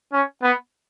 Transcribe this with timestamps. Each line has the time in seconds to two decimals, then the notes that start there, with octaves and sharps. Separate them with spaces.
0.13 C#4
0.43 B3